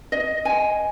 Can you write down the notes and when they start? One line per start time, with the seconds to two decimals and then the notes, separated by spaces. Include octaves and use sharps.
0.12 D#5
0.45 G#5